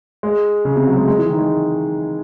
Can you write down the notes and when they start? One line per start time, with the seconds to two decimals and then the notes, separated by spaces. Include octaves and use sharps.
0.23 G#3
0.65 C#3
0.76 C3
0.87 F#3
0.97 G#3
1.08 G#3
1.18 E3
1.29 D#3
1.39 G#3